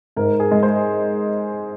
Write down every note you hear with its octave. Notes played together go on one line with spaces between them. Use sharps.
G#2 A#4
G#4
G#3
C5